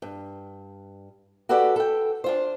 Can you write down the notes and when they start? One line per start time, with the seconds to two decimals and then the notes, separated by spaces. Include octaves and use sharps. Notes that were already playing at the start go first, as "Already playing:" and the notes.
0.02 G2
1.49 F#4 G4 A4 B4 D5 F#5
1.76 A4 G5
2.24 D4 F4 C5